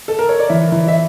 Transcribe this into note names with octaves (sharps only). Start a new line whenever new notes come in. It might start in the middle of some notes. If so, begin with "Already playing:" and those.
A4
A#4
C#5
D5
E3 E5
E3
E5